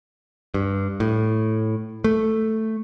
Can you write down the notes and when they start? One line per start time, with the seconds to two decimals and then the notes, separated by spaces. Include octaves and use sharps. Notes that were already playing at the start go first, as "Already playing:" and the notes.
0.54 G2
1.00 A2
2.04 A3